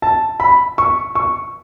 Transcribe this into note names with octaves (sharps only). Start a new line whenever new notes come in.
A5
B5
C#6
C#6